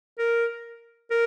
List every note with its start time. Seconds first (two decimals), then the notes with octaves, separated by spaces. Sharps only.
0.19 A#4
1.11 A#4